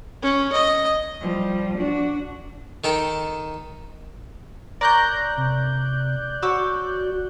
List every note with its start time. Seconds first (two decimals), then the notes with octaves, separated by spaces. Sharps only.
0.23 C#4
0.52 D#5
1.21 F3 G3
1.78 D4 F#4
2.84 D#3 A4 G5
4.81 A#4 C#5 D5 F#6 G6 A#6
5.37 C3
6.42 F#4 C#5 D6 E6